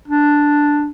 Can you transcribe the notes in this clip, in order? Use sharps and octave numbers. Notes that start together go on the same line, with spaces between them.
D4